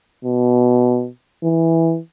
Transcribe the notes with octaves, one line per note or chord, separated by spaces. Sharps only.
B2
E3